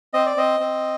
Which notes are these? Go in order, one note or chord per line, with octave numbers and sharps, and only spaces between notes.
C4 D#5
D5
C4 D#5
C4